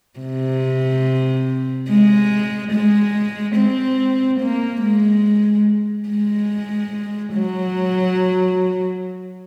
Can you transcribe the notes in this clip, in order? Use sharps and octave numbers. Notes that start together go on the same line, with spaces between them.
C3
G#3
G#3
C4
A#3
G#3
G#3
F#3